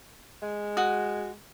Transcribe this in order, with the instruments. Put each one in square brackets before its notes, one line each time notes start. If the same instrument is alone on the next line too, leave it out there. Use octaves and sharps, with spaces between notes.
[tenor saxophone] G#3
[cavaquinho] F#4 D#6